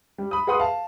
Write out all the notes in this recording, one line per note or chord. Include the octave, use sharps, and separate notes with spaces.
G3
B5 D#6
G#4 B4 F#5 B5 C6 D#6
F5 A5